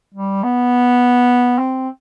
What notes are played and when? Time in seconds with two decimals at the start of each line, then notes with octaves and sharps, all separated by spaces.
0.15 G3
0.43 B3
1.59 C4